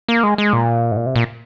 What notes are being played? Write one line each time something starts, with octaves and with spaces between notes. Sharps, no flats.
A#3
G#3
G#3
A#2
G#2
A#2
C3
A#2